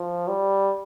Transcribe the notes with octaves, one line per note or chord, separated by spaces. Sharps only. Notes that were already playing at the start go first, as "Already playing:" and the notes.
Already playing: F3
G3